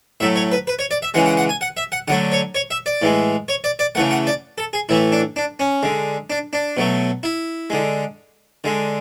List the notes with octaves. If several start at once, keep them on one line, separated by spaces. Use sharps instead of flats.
A2 F#3 A3 E5
C#5
B4
B4
C#5
D5
E5
C#3 E3 G#3 F#5
F#5
F#5
G#5
F#5
E5
F#5
D3 F#3 A3 F#5
C#5
C#5
E5
D5
A2 E3 G#3
C#5
D5
D5
C#3 E3 A3 F#5
F#5
D5
A4
G#4
A2 E3 A3 E4
D4
D4
C#4
D3 G#3
D4
D4
B2 F#3 A3
E4
D3 G#3
D3 G#3